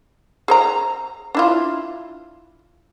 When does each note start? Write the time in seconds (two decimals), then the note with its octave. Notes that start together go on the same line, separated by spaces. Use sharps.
0.48 G#4 C5 A#5
1.35 D4 E4 F4